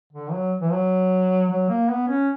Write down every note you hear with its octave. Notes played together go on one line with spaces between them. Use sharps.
D3
F#3
E3
F#3
F#3
A#3
B3
C#4